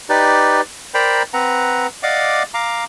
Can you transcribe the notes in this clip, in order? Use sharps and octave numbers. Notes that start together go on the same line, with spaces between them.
D#4 G4 B4 D5
A#4 C5 D5 G5 A#5 B5
C4 B4 F#5 A#5
D5 D#5 F5 F#5 D6
F5 A#5 D6